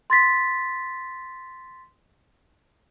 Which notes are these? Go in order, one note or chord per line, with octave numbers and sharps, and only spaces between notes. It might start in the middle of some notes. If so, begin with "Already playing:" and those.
C6 A6 B6